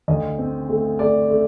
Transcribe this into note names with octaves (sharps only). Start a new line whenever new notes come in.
D2 D#5
C4
A3
A3 D5
A3